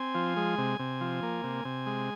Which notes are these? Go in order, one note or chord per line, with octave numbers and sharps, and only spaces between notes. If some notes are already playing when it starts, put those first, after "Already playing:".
Already playing: C4 G#5
F3
G#3
C3
C3
F3
A#3
C3
C3
G#3